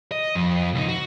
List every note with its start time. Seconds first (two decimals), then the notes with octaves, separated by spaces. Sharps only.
0.12 D#5
0.35 F2
0.75 C#2 D#4
0.88 F#4